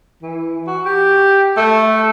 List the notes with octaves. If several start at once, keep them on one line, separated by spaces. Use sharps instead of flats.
E3
F#4
G4
A3